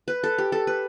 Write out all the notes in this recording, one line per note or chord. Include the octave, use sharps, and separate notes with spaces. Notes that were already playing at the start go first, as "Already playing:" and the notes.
B4
A4
G4
A4
B4